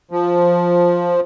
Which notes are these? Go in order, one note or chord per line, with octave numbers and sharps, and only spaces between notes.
F3